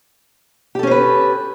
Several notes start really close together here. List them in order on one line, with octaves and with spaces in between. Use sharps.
G4 A4 C#4 C5 B4